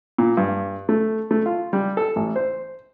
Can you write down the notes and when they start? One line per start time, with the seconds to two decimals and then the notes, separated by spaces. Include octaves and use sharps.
0.18 A#2
0.37 G2
0.89 A3
1.31 A3
1.46 F4
1.73 G3
1.97 A4
2.16 A1
2.36 C5